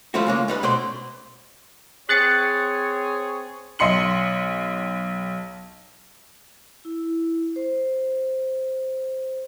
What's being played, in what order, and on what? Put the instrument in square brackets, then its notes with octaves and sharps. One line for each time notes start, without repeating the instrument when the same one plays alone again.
[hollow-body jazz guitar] F3 G3 A3 C4 E4 F#4
C#3 G#3 A#3
G3 D#4 B4
B2 C4 D5 C6
[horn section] C4 G#4 C#5 [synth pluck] F#6 A6 C#7
[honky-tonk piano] B1 D#5 C6 C#7 F#7
[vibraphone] E4
C5